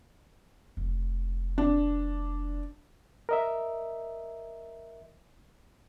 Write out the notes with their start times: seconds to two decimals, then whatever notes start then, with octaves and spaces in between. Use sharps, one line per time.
0.77 F1
1.58 D4
3.29 A#4 D#5 E5